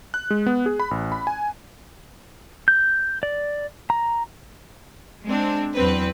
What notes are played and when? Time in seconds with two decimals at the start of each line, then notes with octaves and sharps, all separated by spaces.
0.14 F#6
0.30 G#3
0.46 B3
0.66 G#4
0.80 B5
0.91 A1
1.12 B5
1.27 G#5
2.68 G6
3.23 D5
3.90 A#5
5.25 G#3 C4 D4
5.75 E2 F#3 C4 B4